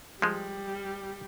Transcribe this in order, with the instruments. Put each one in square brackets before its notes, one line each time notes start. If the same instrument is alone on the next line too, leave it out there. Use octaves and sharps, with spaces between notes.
[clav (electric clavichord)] F3 G#3 [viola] G3